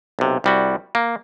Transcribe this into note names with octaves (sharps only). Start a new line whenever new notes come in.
B1 C3
C2 G3 F#4
A#3